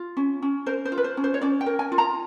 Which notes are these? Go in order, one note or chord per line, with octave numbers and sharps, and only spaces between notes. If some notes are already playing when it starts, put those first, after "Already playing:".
Already playing: F4
C#4
C#4
A#4 C5
C5
F4
B4
C5
C#4
C5
C#5
C#4 D5
G5
A#4
G#5
F4
A#5